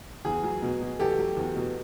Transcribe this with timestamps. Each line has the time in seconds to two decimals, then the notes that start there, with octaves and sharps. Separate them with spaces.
0.25 E2 G#4
0.43 F#3
0.62 B2
0.81 B2
0.99 E2 G4 A4
1.18 F#3
1.37 E2
1.56 B2